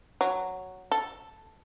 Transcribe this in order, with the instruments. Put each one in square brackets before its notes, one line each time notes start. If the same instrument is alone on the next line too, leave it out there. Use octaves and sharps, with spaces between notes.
[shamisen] F#3
A4